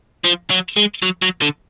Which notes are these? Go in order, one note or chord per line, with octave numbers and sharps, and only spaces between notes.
F3
F#3
G#3
F#3
F#3
D3